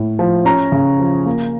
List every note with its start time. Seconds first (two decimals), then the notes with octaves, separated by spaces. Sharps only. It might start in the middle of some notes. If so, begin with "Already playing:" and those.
Already playing: A2
0.19 F3
0.45 C#4 A#5
0.72 C#3
0.99 F3
1.26 A#3